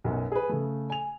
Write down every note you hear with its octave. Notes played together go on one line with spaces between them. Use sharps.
B1 F#2 B2
G#4 B4
C#3 A3
G#5 F7